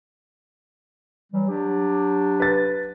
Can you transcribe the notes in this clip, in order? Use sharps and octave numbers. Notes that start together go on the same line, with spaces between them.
E3 F#3 G3
F#3 D4 G4
B4 A6